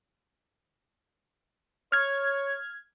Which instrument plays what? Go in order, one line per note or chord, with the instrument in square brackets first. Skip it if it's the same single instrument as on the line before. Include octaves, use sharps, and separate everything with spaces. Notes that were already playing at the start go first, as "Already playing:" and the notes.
[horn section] C#5 [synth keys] F6 G#6